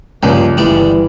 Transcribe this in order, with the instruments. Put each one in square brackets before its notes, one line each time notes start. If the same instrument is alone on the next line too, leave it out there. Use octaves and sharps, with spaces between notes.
[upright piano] C#2 [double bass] G2 A#3 [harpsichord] F3 G3 C5
[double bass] G1 [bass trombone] E3 [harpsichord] G3 G#3 D5